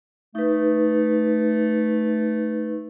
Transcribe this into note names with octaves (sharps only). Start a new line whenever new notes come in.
A3 D#4 B4